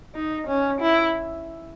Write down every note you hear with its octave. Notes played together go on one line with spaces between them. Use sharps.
D#4
C#4
E4